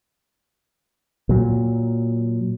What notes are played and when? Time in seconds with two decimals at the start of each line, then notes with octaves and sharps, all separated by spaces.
1.29 A#2 F#3